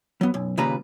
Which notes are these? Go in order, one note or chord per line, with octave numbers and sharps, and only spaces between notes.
F#3 B3
B1 F#2
D#2 A#2 C#3 G3 B4 A#5